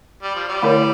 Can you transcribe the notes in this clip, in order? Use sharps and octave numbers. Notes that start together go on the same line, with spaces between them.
G3
F3
G3
D3 A3 E4 A#4 C#5